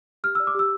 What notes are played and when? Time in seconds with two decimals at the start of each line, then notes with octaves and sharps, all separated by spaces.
0.24 G4 F6
0.35 D5 E6
0.47 D6
0.55 G4 E6